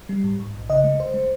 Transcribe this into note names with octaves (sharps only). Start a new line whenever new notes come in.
G3
G#2
G#2
A#1
C#3 D#5
G#3
C#2 C5
G#3